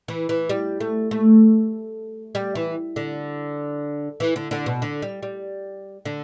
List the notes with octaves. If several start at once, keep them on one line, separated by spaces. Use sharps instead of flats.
E3
E3
G3
A3
A3
G3
E3
D3
E3
D3
D3
B2
D3
G3
G3
D3